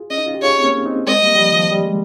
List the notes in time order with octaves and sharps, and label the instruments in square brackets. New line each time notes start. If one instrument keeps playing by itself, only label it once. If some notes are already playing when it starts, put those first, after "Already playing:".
Already playing: [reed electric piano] F4 G#4
[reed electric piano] C#4 [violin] D#5
[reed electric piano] D#4
F4
G4
[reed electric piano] F4 G#4 [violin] C#5
[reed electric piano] C4
A#3 C#4
C4 D#4
[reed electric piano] G#3 C4 [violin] D#5
[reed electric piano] G3 A#3
G3
F3
D#3
F3
G3
G#3